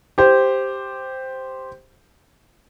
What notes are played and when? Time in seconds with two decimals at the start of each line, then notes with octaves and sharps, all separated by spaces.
0.18 G4 C5